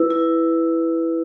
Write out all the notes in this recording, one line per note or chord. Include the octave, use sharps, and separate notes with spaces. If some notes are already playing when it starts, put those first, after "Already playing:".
Already playing: E4 B4
E4